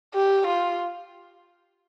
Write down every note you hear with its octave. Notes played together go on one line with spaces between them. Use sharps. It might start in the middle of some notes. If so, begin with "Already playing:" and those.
G4
F4